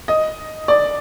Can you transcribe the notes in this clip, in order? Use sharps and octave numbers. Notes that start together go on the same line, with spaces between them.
D#5
D5